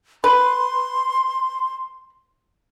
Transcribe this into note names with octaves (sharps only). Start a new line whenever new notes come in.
B4 C6